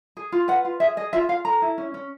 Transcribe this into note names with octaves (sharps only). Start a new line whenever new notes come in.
G#4
F4
B4 F#5
F4
G#4 E5
G#4 D#5
F4 E5
F4 F5
A4 A#5
E4
C#4
C#4